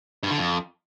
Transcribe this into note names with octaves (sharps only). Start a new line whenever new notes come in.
G2
D3
F2